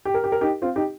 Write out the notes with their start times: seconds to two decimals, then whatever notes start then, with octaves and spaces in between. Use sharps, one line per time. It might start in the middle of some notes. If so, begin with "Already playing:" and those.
0.05 G4
0.14 A#4
0.24 G4
0.32 A#4
0.41 D#4 G4
0.62 C4 F4
0.76 D#4 G4